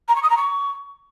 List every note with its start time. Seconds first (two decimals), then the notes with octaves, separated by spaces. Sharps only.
0.08 A#5
0.16 C#6
0.23 D#6
0.30 A#5
0.37 C#6